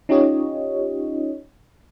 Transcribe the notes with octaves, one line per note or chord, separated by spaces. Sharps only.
C#4 D#4 F4 G4 C#5 D#5